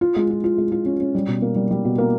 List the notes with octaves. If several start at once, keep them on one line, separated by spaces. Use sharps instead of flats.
F4
G#3
F4
F4
G#3
F4
C#4
C#4
G3
B2
A#3
G3
G3
B2
A#3